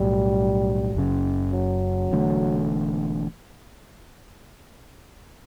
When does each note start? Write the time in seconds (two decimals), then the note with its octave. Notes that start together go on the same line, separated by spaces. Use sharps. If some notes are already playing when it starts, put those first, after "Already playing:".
Already playing: B1 A2 F#3 G3
0.95 F#1 F#2 C#3
1.53 F#3
2.11 E1 E2 D3 A3